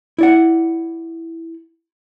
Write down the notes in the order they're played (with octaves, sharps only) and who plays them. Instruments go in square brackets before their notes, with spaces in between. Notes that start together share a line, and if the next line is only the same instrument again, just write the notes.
[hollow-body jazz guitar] E4 D5 F#5